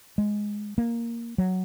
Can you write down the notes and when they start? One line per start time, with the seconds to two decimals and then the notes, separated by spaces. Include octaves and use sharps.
0.18 G#3
0.78 A#3
1.38 F#3